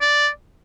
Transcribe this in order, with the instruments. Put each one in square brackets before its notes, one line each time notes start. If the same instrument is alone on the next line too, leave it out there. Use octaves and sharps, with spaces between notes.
[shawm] D5